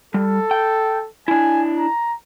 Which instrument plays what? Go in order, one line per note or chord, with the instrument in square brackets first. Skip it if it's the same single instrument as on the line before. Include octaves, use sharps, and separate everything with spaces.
[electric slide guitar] G3 [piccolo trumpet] A4
[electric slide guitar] G5
[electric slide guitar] D4 E4 [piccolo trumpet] G#5
[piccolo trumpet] A#5